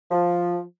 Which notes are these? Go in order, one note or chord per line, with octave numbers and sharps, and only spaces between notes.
F3